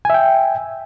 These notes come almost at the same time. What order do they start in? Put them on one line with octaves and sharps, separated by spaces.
G#5 E5 G5